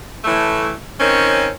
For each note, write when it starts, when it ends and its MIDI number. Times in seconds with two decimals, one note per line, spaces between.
0.25 0.73 45
0.25 0.73 52
0.25 0.73 57
1.00 1.50 51
1.00 1.50 60
1.00 1.50 61